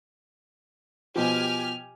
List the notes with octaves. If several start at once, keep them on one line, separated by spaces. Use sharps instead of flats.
B2 F3 G4 G#5 F6